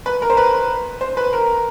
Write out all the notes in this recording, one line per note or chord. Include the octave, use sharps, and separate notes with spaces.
B4
A#4
C5
B4
C5
B4
A#4